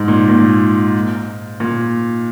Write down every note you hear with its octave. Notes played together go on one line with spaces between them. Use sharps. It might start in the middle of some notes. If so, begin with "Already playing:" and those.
Already playing: G#2
A#2
A#2
A#2